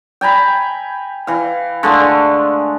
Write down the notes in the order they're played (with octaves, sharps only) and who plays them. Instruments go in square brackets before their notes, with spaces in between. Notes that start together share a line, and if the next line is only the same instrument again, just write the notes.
[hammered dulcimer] G5 G#5 A#5 B5
E3 F5
D3 G#3 A3 F5